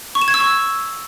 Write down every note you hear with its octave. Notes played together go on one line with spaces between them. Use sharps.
C#6
E7
G#6
E6
C#6